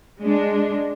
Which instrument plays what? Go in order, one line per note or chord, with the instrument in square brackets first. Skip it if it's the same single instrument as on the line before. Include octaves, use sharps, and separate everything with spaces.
[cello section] G#3 D4